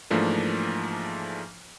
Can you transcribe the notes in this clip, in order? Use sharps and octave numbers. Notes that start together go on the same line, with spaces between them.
G#2 E3 F3 A3 A#3 D4